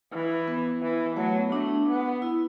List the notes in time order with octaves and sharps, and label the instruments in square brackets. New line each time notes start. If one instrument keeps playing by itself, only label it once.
[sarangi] E3
[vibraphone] B3
[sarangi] E3
[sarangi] F#3 [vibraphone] A3
[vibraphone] B3
[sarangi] A3 [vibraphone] D4
[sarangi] B3
[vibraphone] E4